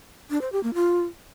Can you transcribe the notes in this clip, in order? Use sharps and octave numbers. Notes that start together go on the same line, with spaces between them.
D4
C5
G4
A#3
F4